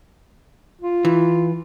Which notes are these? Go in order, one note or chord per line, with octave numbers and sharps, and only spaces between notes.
F4
E3